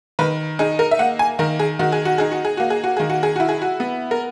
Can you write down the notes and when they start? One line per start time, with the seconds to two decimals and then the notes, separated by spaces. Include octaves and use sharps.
0.19 D#3 B4
0.59 D#4 G#4
0.79 A#4
0.91 E5
0.99 A#3 F#5
1.19 G#5
1.39 D#3 A#4
1.59 G#4
1.79 D#3 F#4
1.92 G#4
2.05 F#4
2.18 D#4 G#4
2.32 F#4
2.45 G#4
2.57 A#3 F#4
2.70 G#4
2.84 F#4
2.97 D#3 G#4
3.10 F#4
3.23 G#4
3.36 E4 F#4
3.49 G#4
3.62 F#4
3.80 B3
4.11 A#4